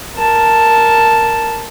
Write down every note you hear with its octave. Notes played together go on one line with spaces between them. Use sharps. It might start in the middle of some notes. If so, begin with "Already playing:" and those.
A#4 A5